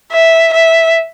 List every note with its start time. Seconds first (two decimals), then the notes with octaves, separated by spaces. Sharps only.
0.12 E5
0.53 E5